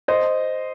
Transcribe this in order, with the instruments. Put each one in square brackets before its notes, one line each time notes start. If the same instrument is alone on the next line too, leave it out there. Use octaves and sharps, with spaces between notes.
[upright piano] C5 D#5